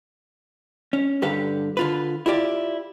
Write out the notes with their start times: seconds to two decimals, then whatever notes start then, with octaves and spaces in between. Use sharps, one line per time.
0.93 C#4
1.22 G2 D3 G4 B4 F5
1.77 D3 F4 B4
2.26 E4 F4 G4 D5